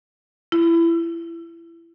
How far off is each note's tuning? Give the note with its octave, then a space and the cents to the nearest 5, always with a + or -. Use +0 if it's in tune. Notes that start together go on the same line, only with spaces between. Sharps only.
E4 +25